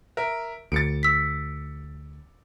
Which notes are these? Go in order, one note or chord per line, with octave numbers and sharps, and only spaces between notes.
A#4 E5
D2 A6 C#7 D7
E6 B6